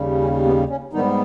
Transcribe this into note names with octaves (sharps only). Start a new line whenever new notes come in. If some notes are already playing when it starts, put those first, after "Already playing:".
Already playing: D#2 C#3 G3
C#4
B3
C#4
G#2 D#3 G3 B3 D#4